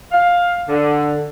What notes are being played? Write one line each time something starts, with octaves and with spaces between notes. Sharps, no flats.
F5
D3